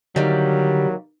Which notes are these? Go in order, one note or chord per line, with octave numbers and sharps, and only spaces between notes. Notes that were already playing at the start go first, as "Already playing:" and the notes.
D3 D#3 F#3 G3 A#3